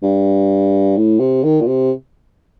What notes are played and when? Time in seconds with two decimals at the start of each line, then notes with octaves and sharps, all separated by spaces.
0.03 G2
0.97 A2
1.20 C3
1.44 D#3
1.61 A#2
1.67 C3